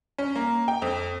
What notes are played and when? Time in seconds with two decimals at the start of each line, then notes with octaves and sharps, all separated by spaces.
0.18 C#4
0.35 A#3
0.68 G5
0.82 F2